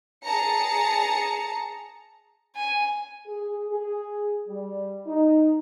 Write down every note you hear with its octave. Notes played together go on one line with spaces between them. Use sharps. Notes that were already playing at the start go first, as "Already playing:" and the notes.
G#4 A5 A#5 C#7
G#5
G#4
G#4
G3
D#4